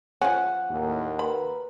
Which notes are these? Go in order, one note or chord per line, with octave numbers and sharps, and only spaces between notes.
F3 C#4 F#5
D#2 A2 A#3
A#4 B4 B5